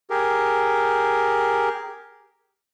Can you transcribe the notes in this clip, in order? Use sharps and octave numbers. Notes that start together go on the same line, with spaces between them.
G4 G#4 A#4